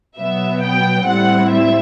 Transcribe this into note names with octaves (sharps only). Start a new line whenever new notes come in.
B2 F#3 B3 E5
G5
A2 G3 C4 E4 F#5
E5